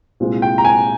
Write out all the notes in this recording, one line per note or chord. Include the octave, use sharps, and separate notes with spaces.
C2 A#2 G#3 C4 F4
G5
A#5
G#5